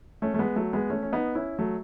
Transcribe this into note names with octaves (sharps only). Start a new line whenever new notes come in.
A3 C#4
A3
G#3 B3
F#3 A3
G#3 B3
A3 C#4
C#4
B3 D#4
C#4 E4
F#3 A3